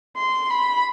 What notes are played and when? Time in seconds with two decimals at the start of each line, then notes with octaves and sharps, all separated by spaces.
0.17 C6
0.50 B5